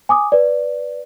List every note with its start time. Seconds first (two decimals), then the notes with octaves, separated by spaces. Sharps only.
0.09 G#5 D6 D#6
0.32 B4 D5